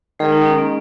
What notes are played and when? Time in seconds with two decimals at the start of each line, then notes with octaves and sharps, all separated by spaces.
0.19 D#3 G#3 G#4
0.32 D#4
0.45 C#4
0.58 A#3